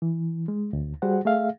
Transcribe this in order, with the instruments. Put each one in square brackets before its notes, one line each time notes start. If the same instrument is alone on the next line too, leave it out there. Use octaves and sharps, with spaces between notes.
[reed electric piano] E3
G#3
D2
G3 F#4 G#4 C5 F#5
A3 G#4 E5 F5